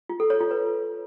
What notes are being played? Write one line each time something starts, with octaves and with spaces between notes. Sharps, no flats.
F4
A4
C#5
F4
B4